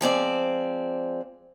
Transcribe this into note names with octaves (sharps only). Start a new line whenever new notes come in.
F3 G#3 C4 D5